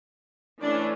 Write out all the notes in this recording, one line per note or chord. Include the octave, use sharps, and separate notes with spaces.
E3 A3 C#4 D4 D5